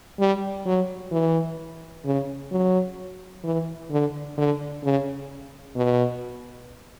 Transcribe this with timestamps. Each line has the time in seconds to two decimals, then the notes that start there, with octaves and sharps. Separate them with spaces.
0.19 G3
0.66 F#3
1.12 E3
2.05 C#3
2.51 F#3
3.44 E3
3.91 D3
4.38 D3
4.83 C#3
5.76 B2